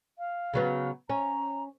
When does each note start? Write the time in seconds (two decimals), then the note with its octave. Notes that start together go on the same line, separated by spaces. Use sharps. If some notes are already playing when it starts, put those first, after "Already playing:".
0.19 F5
0.54 C#3 F#3 B3
1.10 C#4 A#5